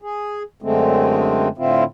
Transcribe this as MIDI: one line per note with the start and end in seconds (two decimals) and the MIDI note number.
0.02 0.43 68
0.62 1.48 42
0.62 1.48 50
0.62 1.48 56
0.62 1.48 57
0.62 1.48 60
1.58 1.84 45
1.58 1.84 50
1.58 1.84 60
1.58 1.84 64
1.58 1.84 65